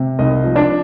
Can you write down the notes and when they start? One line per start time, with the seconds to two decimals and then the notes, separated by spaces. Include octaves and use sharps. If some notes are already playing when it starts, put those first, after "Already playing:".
Already playing: C3
0.19 C2 D#4 D#5
0.44 F3
0.55 D4 D5